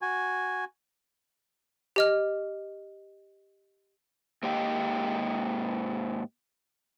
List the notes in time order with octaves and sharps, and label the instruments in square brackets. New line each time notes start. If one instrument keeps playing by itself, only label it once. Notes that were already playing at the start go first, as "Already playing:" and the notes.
[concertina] F#4 G#5
[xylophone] G4 D#5 F6
[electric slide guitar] G#2 A#3 G4 D#5 G5